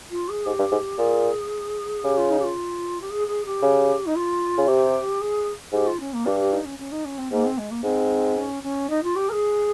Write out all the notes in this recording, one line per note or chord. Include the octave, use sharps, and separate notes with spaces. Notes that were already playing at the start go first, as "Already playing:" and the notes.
F4
G#4
G#2 G4
G2
G#2
A#2 G#4
C#3 G4
F4
D#4
G4
F4
G4
G#4
G#4
G4
C#3
D#4
F4
C#3
C3 G4
G#4
G#2 G4
F4
C#4
A#3
G2 G4
G4
D#4
C#4
C#4
D#4
C#4
C4
G#2 A#3
C4
G#3
A#3
G#2 C4
C#4
C#4
D#4
F4
G4
A#4
G#4